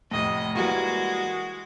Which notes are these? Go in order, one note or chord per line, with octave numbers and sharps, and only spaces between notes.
F1 A2 D#5
E3 G3 G#3 A#3 F#4